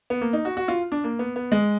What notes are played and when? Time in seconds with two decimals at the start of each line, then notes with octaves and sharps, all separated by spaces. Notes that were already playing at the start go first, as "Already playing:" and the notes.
0.10 B3
0.21 A#3
0.33 D#4
0.45 F#4
0.57 F#4
0.68 F4
0.92 D4
1.04 A#3
1.19 B3
1.36 B3
1.52 G#3